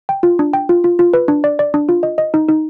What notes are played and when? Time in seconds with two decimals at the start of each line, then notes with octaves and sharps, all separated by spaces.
0.09 G5
0.23 F4
0.39 D4
0.53 G5
0.69 F4
0.84 F4
0.99 F4
1.14 B4
1.28 D4
1.44 D5
1.59 D5
1.74 D4
1.89 F4
2.03 D#5
2.18 D#5
2.34 D#4
2.49 D#4